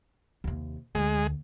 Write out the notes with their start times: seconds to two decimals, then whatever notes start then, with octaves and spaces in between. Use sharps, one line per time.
0.44 D#2 C3
0.95 D2 G#3